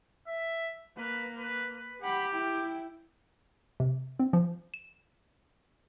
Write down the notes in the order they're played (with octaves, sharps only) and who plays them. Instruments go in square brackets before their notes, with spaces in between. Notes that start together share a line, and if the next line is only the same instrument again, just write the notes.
[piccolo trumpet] E5
[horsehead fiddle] A#3 [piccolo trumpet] B4
[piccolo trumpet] B4
B4
[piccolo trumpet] G4 [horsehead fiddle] F#5 B5
[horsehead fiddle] E4 G5
[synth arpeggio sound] C3
C4
F3
E7